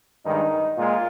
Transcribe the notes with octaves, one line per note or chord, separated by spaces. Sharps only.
G2 D#3 G#3 D#4
A#2 G#3 F4